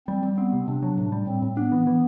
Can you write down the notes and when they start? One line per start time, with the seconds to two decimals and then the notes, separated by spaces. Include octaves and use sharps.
0.08 G3 C4
0.23 G3
0.37 B3 C4
0.53 C3
0.67 C3 D4
0.82 F#3
0.97 A2
1.12 G3
1.27 A2 C4
1.42 A2
1.57 B3 D4
1.72 E3
1.87 E3